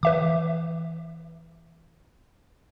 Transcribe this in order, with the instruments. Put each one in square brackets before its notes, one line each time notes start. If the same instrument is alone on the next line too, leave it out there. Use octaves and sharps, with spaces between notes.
[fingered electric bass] E3 [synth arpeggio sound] B4 E5 D6